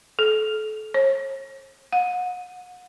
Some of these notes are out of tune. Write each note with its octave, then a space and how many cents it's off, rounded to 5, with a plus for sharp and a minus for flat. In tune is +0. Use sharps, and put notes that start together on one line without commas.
A4 -30
C#5 -45
F#5 -35